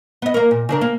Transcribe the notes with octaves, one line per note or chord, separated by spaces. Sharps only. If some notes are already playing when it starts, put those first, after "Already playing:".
B3 D#5
A#3 A#4
A#2
C#3 D4 A#4
A#3